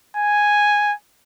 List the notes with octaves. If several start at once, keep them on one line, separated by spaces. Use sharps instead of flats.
G#5